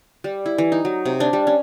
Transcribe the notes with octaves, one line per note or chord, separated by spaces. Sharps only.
G3
E4
E3
D#4
F#3
C3
D4
G3
C#4